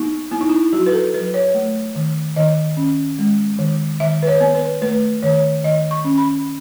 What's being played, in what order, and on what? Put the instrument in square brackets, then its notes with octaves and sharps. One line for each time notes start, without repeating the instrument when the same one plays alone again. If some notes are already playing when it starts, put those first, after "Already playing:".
Already playing: [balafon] B3 D#4
B3 E4
D#4
E4
F#3 F#4
B4
A4
F#3 B4
C#5
A3
D#3
D#3 D#5
C#4
G#3
D#3
D#3 E5
B4
C#5
B3
B4
A3 B4
D#3 C#5
D#3 D#5
C#6
C#4
B5